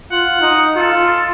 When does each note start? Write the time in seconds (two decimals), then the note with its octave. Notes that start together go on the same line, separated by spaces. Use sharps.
0.11 F4 F#5
0.41 D#4
0.76 F4 A4